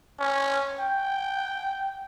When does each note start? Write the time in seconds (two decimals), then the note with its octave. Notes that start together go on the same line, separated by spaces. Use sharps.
0.20 C#4
0.80 G5